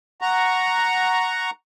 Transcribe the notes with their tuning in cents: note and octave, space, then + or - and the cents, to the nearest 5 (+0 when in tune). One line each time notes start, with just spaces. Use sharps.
F#5 +0 A#5 +0 C#6 +0